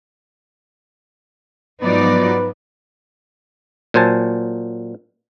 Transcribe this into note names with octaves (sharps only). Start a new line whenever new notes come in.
G#2 F3 F#3 B3 D#4 B4 D5
A#2 F#3 C5 G#5 A5